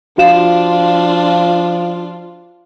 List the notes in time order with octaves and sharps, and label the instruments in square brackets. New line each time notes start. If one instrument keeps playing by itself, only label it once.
[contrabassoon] F3 [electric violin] D4 F4 [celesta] F#4 F5 E7